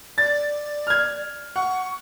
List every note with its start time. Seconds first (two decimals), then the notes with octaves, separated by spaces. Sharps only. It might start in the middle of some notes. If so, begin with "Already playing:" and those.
0.18 D5 A6
0.87 F6 G#6
1.56 F#5 C#6